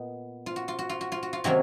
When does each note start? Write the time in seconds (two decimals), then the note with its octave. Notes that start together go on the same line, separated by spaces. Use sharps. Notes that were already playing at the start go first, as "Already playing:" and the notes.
Already playing: A#2 B3 D#4
0.46 F4
0.56 F#4
0.68 F4
0.79 F#4
0.89 F4
1.01 F#4
1.12 F4
1.23 F#4
1.33 F4
1.44 C3 D#3 F#3 A#3 C#4 F#4